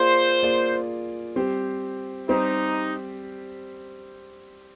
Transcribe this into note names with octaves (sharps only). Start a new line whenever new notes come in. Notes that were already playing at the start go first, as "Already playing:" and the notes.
Already playing: A#3 F4 G#4 C5 D5
A#3 F4 G#4 D5
G3 C4 G4 C5
G3 C4 D#4 G4 C5